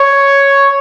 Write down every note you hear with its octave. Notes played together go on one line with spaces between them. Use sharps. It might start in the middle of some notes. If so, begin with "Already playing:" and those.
Already playing: C#5